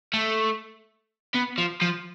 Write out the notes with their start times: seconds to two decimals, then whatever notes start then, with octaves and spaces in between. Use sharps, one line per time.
0.14 A3
1.34 B3
1.58 F3
1.82 F3